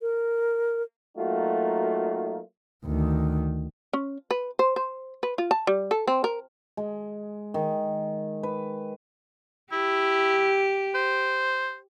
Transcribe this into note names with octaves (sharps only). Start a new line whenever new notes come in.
A#4
F#3 A3 A#3 D#4 F4 F#4
D2 D#3
C#4
B4
C5
C5
B4
F4
A5
G3
A4
C4
A#4
G#3
D#3
B4
E4 G4
C5